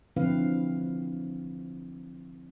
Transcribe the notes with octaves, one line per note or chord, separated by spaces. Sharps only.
D3 F3 C4 E4 B4 F5